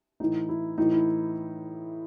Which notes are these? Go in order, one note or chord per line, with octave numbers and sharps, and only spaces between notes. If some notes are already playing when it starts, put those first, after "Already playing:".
A2 E3 D#4
E4
A2 E3 D#4
E4